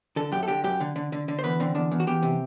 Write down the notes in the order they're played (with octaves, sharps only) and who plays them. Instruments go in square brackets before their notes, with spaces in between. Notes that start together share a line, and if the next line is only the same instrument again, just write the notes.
[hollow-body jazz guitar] D3 A4
F#2 G4
A4
D3 G4
F#2 G4
D3
D3
D3
D3
C5
E2 B4
D3 C4
E2 D4
E2
F#4
E2 G4
C3